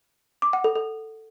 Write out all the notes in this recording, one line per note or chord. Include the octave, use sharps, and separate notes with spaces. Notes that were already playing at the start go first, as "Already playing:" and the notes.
D6
F#5
A4
A4